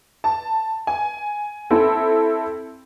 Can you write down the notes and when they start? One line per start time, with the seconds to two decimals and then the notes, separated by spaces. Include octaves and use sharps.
0.24 A5
0.87 G#5
1.70 C4 E4 A4